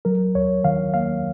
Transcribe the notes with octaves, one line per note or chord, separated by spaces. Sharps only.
F#3 A#4
D#2 C#5
D#3 F5
A#3 F5